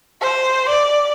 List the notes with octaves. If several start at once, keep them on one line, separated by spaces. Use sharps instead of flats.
C5
D5